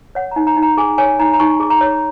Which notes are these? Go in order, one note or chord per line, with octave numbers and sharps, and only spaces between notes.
C#5 F#5
D#4 A#5
A#5
D#4
A#5
G#4 G#5
C#5 G#5
D#4 A#5
A#5
D#4 C#6
G#4
A#5
C#5